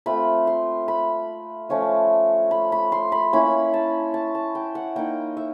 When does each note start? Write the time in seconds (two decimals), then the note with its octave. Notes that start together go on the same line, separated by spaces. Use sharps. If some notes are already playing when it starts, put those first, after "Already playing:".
0.06 A3 C4 F4 B5
0.47 C6
0.88 B5
1.69 F3 A3 C#4 F4
2.51 B5
2.72 B5
2.92 C6
3.12 B5
3.33 A#3 C#4 E4 B5
3.74 A5
4.14 A5
4.35 A5
4.55 G5
4.75 F#5
4.96 A#3 D#4 G5
5.37 E5